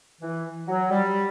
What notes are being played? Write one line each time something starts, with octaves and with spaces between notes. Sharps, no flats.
E3
F#3
G3